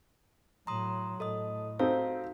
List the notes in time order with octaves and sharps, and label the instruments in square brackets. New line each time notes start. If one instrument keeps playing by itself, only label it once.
[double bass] A2 F#3 [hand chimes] A#5 C6 D#6
[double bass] A2 [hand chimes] A4 D#5 D#6
[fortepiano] C4 D#4 A4 [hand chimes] F#4 F5